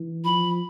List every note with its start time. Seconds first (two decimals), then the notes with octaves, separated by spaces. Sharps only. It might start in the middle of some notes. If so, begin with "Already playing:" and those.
Already playing: E3
0.24 F3 B5